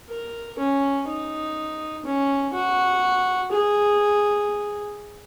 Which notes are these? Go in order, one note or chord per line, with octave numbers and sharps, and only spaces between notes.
A#4
C#4
D#4
C#4
F#4
G#4